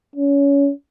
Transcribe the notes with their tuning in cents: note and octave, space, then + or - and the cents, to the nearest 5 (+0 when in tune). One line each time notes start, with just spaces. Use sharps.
C#4 +25